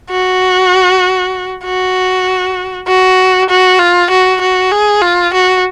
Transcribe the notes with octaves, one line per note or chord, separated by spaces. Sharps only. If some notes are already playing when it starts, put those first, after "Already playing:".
F#4
F#4
F#4
F#4
F4
F#4
F#4
G#4
F4
F#4